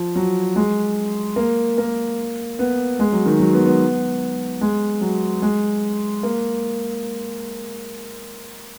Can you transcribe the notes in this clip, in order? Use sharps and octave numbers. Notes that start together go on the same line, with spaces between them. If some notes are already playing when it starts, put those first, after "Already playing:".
Already playing: F3
F#3
G#3
A#3
A#3
B3
G#3
F#3
D#3
F#3
B3
B3
G#3
F#3
G#3
A#3